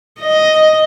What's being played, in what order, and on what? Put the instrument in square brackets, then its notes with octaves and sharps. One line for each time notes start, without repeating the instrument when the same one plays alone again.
[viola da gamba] D#5